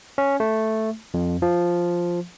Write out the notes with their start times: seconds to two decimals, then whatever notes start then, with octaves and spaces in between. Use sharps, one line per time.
0.18 C#4
0.40 A3
1.14 F2
1.42 F3